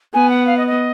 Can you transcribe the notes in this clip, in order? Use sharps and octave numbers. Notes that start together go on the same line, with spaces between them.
B3 G#5
F#5
F5
D#5
D#5